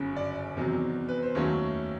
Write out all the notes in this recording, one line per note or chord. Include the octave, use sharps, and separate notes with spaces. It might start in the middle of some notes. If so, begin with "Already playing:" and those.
Already playing: G1 F#2 C#3
D5
E2 C3 D#3 F#3
B4
C5
D#2 D#3 F#3 A3 C#4 C#5